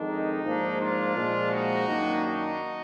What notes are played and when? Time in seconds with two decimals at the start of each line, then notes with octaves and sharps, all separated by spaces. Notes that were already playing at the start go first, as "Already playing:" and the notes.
Already playing: F2 D#3 G#3 D4
0.08 D#4
0.43 G#2 F3 A#3 D4
0.79 D4 F4
1.16 A#2 F3 G#3
1.51 D#4 F#4
1.87 F#2 D#3 A#3 D4
2.23 D#4 F#4